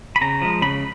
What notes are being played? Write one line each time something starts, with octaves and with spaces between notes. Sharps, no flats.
B5
C#3 A#5
F3 G#3
C#3 B5